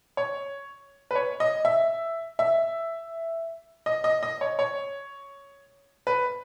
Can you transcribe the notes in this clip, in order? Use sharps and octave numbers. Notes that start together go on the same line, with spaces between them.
C#5
B4
C#5
D#5
E5
E5
D#5
D#5
D#5
C#5
C#5
B4